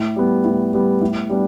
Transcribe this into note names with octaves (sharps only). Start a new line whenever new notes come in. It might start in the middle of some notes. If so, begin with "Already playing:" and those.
Already playing: A2
G3 B3
A2
G3 B3
A2
G3 B3 D4